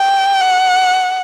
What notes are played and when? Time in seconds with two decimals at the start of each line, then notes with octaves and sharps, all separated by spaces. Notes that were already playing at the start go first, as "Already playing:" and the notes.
Already playing: G5
0.41 F#5